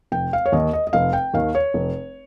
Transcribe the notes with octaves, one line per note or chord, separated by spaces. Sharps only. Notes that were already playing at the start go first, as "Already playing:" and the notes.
F1 G5
F5
C#5
D#2 D#3 D#5
D#5
D#5
F1 F5
G5
D#2 D#3 F5
C#5
F1